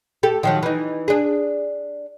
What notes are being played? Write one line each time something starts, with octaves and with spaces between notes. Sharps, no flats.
G4 A4
D#3 F3 F#3
E3 D#4
D4 G#4